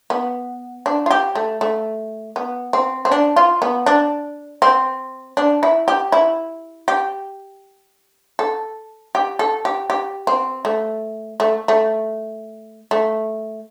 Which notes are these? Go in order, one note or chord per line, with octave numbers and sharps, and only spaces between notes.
B3
D4
F4
G4
A3
A3
B3
C4
C4
D4
F4
B3
D4
C4
D4
E4
G4
E4
G4
A4
G4
A4
G4
G4
C4
A3
A3
A3
A3